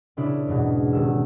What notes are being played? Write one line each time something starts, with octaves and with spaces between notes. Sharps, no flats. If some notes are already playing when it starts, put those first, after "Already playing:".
A#2 C#3 D4 E4
E2 G#2 B2
D#1 E6